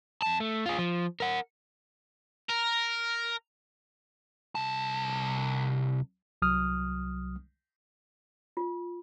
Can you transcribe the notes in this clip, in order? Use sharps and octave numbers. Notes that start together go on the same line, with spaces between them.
F2 A5
A3
F4 G#4
F3
A#4 F#5
A#4
C2 A5
C2 F#3 D#6 F6
F4